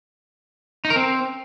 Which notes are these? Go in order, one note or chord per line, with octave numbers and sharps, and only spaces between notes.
D#4
A#4
C4